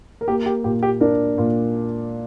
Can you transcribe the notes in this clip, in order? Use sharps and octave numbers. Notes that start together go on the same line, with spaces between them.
A#4
A#3 G4
G4
A#2 G4
G4
A#3 D4 A#4
A#2